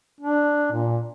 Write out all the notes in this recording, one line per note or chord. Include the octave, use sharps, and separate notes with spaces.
D4
A#2